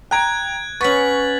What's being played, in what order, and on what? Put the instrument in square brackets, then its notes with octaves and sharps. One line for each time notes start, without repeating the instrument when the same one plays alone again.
[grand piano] G5 A#5 D7 [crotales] F#6 G#6
[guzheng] B3 C#4 [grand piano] C#6 [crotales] A6 B6 F#7